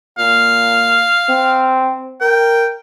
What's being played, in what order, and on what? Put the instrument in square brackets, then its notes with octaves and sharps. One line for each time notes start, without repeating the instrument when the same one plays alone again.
[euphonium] A#2 [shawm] F5
[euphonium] C4
[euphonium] A#4 [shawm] G5